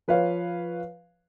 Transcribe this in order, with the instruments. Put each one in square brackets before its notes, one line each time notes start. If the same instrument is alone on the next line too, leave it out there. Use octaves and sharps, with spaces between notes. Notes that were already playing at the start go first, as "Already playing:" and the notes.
[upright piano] F3 B4 C#5 F5